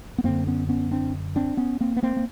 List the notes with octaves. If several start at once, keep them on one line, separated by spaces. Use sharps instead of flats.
B3
F#2 D3 A#3 C4
B3 C#4
B3 C#4
C4 D4
C4 D4
B3 C#4
A#3 C4
B3
A#3 C4
A#3